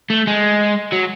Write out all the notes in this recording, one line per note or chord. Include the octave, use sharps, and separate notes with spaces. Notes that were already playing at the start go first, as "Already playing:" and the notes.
A3
G#3
F#3